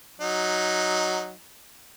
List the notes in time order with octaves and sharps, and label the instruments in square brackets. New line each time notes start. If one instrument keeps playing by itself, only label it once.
[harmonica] F#3 D#4